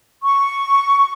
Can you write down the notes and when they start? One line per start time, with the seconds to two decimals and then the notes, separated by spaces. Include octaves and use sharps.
0.23 C#6